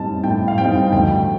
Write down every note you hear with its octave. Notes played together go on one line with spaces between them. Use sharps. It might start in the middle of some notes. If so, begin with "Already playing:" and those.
Already playing: A2 G3 C4 D#4 A5
A2 G5
F5
G3 C4 D#4 G5
D2 G5